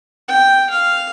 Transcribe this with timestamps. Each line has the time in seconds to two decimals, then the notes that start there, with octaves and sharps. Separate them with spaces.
0.28 G5
0.70 F5